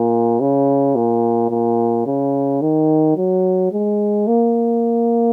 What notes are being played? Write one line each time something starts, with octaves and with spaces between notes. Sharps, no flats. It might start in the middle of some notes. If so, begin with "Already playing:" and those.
Already playing: A#2
C#3
A#2
A#2
C#3
D#3
F#3
G#3
A#3